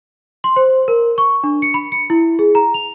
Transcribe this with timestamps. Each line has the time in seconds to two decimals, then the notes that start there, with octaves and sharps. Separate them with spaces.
0.44 C6
0.56 C5
0.88 A#4
1.18 C#6
1.44 D4
1.62 C#7
1.74 B5
1.92 C#7
2.10 E4
2.39 G#4
2.55 A#5
2.74 F7